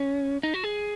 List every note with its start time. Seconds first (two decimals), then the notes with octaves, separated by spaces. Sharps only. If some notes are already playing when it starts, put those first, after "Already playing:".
Already playing: C#4
0.43 D#4
0.54 F#4
0.64 G#4